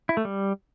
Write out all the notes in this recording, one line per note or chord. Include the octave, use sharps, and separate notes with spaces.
E4
A3
G3